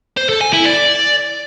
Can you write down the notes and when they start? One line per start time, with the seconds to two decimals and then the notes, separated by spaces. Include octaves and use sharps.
0.17 C5
0.29 A4
0.41 G#5
0.53 E4
0.65 D5